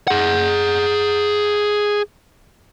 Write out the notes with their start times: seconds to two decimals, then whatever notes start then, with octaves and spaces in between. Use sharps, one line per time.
0.08 G#4 F#5